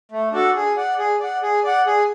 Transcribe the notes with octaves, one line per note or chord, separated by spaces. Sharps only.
A3
D4 F#4 A4
G#4
D5 F#5
G#4
D5 F#5
G#4
D5 F#5
G#4